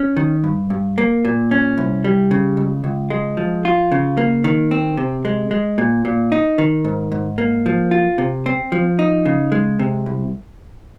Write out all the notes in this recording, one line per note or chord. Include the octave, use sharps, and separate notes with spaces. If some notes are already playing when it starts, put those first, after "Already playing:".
Already playing: C#4
D#3
G2
G2
A#3
A#2
C#4
C2
G3
C#3
C#2
C#2
G#3
F3
F4
C#3
A#3
D#3
C4
C3
G#3
G#3
A#2
A#2
D#4
D#3
G#2
G#2
A#3
F3
F4
C3
C4
F3
D#4
C#3
G#3
C3
C2